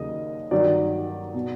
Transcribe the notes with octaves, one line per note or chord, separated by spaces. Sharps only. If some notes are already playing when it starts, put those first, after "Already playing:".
Already playing: D#2 C#3 F#3 A#3 D#5
G2 D#3 F#3 D5
B2